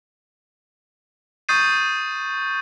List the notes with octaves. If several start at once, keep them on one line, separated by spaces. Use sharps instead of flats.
C#6 D#6 G6 A6 C7 D#7